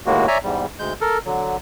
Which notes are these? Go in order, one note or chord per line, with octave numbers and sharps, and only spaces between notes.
D#2 A2 G#3 A#3 F#4
C#5 D5 E5 G#5 A#5
E2 G#2 G3
D2 G#3 G6
A4 A#4
D3 F#3